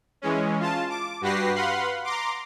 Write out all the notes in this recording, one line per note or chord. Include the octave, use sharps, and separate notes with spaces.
E3 G#3 C#4
F4 A5
D6
G2 F#4 G4 B4 A#6 C7
B4 F5 F#5 B5 C6
A#5 C6 D6